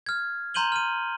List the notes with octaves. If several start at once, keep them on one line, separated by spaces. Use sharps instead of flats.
F6 G#6
A#5 C6 G6 D#7 F#7 G7
F6 D#7